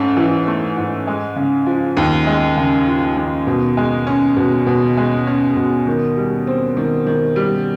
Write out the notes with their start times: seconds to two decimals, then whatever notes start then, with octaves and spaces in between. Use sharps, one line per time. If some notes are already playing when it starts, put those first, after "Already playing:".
Already playing: G#2 A3 C#4
0.17 E3
0.47 A3
0.77 G#2
1.07 G#3
1.36 C#3
1.66 F3
1.97 D#2
2.27 G#3
2.57 C#3
2.87 F3
3.17 D#2
3.47 B2
3.77 G#3
4.07 C#4
4.37 B2
4.67 B2
4.97 G#3
5.27 C#4
5.56 B2
5.87 D#3
6.17 G3
6.47 C4
6.77 D#3
7.07 D#3
7.36 G3